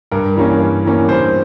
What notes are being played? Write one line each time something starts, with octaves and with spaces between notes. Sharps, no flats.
G2 A#4
E3 G3 A#3 C#4
G2
E3 G3 A#3 C#4
G2 C5